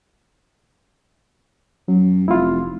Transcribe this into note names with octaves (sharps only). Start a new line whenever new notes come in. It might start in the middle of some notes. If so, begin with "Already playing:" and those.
F#2 F#3
F1 E4 F4